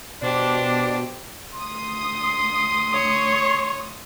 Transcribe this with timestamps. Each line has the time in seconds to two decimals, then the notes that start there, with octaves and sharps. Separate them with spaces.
0.22 B2 D4 G4 C5
1.54 D2 C6 D#6
2.94 C#5 C#6